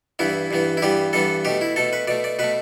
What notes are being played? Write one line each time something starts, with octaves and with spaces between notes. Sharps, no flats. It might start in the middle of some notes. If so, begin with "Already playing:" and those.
G2 E3 B3 E4
G2 E3 B3
E4
G2 E3 G3 B3 G4
G2 E3 G3 B3 A4
B2 A3 G4
E4
B2 A3 A4
B4
B2 A3 D5
D5
B2 A3 B4